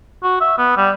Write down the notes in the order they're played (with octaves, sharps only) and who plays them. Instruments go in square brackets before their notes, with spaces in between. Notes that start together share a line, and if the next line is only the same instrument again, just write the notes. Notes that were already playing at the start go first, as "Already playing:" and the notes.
[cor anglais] F#4
E5
B3
G3